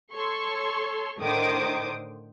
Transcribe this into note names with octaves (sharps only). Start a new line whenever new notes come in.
A4 C#5 C6 C#6
A2 D3 D#3 C5 D6 D#6